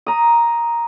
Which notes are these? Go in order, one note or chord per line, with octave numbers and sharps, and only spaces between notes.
A#5 D#6